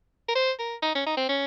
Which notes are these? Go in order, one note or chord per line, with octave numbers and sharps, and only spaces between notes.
A#4
C5
A#4
D#4
C#4
D#4
C4
C#4